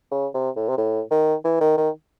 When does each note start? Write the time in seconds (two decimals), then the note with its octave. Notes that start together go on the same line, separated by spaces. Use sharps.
0.11 C#3
0.34 C3
0.56 A2
0.69 C3
0.77 A2
1.11 D#3
1.44 E3
1.61 D#3
1.78 D#3